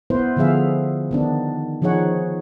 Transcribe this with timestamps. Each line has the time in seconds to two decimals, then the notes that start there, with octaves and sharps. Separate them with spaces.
0.10 B3 E4 B4 C5
0.37 D3 F3 B3 G#4 E5 F5
1.11 D#3 B3 D4
1.82 D#3 F3 D#4 G#4 C#5 F#5